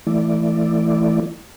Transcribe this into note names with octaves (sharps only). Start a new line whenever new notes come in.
E3 A3 E4 D5